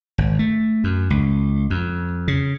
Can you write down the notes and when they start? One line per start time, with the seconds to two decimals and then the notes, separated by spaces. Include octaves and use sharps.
0.18 G#1
0.39 A3
0.84 F#2
1.10 C#2
1.70 F2
2.28 C#3